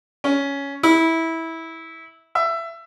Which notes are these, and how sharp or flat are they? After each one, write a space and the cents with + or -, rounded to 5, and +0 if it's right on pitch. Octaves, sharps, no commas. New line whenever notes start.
C#4 +10
E4 -15
E5 +20